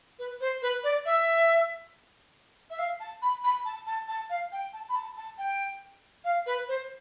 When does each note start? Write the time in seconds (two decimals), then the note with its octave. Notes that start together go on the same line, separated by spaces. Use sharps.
0.19 B4
0.40 C5
0.62 B4
0.83 D5
1.05 E5
2.70 E5
2.78 F5
3.00 A5
3.22 B5
3.44 B5
3.65 A5
3.86 A5
4.08 A5
4.29 F5
4.52 G5
4.73 A5
4.89 B5
4.95 A5
5.17 A5
5.38 G5
6.24 F5
6.46 B4
6.68 C5